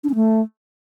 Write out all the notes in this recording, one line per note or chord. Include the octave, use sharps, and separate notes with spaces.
D4
C#4
A3